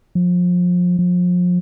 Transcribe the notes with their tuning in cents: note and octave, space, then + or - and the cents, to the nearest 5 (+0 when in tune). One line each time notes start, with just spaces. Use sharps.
F3 +30
F3 +35